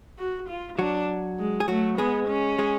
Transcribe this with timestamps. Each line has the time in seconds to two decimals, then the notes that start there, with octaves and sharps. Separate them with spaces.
0.19 F#4
0.49 F4
0.79 F#3 D4 F#4
1.39 G#3
1.60 G#4
1.68 F#3 A3 F#4
1.98 G#3 B3 G#4
2.28 C#4
2.59 G#3 G#4